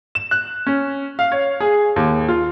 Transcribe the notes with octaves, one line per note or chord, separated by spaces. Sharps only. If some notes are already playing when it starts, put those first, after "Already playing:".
E7
F#6
C#4
F5
C#5
G#4
D#2
F4